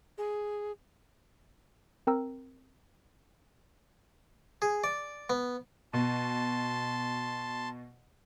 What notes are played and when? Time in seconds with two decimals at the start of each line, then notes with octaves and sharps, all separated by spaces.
0.18 G#4
2.07 C4 A#4 G5 A#5 E6
4.62 G#4
4.84 D5
5.30 B3
5.93 B2 A5 C6